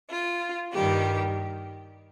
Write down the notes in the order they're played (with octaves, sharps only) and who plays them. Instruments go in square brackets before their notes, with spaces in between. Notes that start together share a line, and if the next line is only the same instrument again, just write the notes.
[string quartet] F4
G2 D#3 G3 G4